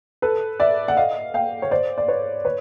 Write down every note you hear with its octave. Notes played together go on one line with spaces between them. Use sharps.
A4 B4
D5 E5
F#5
D#5 F5
F5 G5
C#5
C5 D5
D5
B4 C#5
B4 C#5